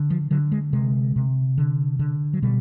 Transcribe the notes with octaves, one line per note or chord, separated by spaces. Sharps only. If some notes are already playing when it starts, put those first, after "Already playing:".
Already playing: D3
F3
D3 F#3
G#3
C3 G#3
C3
D3
D3
F#3
B2 G3